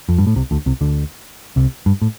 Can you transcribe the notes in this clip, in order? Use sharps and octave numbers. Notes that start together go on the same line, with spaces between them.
F2
G2
A2
C2 C3
D2 D3
C2 C3
D2 D3
C2 C3
G2
A2